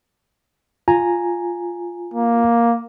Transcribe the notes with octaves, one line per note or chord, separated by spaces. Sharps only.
F4 G#5 A#5
A#3